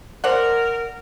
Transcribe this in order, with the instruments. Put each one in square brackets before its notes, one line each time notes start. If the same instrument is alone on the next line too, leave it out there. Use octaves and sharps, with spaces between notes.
[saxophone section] A#4 [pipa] C5 D5 F#5